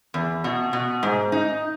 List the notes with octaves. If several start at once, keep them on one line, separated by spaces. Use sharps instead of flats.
E2
B2
B2
G#2
D#4